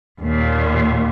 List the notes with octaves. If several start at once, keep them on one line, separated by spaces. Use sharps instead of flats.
D#2 A#2